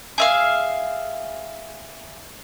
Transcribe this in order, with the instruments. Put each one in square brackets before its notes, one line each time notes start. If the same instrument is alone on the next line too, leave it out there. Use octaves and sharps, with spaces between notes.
[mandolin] G#4 E5 F5